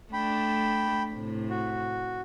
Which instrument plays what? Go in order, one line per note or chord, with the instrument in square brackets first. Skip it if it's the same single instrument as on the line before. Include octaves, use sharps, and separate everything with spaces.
[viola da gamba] A3 D4 [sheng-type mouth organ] G5 B5
[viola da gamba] A2 C3
[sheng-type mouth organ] F#4